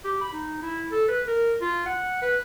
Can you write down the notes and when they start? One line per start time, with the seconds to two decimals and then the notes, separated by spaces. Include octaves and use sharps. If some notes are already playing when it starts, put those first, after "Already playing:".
0.04 G4
0.21 B5
0.33 D#4
0.63 E4
0.92 A4
1.08 B4
1.27 A#4
1.61 F4
1.86 F#5
2.22 B4